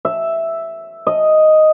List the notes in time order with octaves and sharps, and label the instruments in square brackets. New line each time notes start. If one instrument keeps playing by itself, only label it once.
[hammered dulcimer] E5
D#5